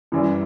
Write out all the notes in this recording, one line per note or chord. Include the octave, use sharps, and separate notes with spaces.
F#2 E3 G3 E4